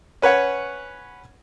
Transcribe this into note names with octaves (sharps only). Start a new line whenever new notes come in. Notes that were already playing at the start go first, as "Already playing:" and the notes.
C#4 B4 C#5 F#5